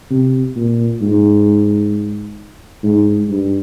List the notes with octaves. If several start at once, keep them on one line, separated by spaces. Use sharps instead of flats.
C3
A#2
G#2
G#2
G2